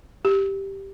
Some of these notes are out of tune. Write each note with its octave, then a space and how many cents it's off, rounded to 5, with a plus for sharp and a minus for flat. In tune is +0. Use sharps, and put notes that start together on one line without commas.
G4 -5